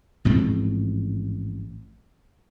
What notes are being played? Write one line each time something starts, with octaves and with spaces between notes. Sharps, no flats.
A1 G#2 F3 C4